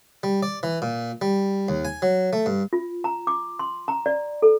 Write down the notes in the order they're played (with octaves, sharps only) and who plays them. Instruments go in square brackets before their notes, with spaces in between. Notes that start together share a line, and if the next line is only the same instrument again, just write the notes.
[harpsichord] G3
D5
E3
A#2
G3
D#2
G#5
F#3
A3
G2
[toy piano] F4
A#5
D6
C6
A#5
D5
A4